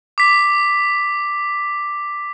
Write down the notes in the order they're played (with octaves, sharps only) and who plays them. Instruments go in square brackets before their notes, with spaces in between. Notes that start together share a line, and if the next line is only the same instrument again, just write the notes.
[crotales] D6 B6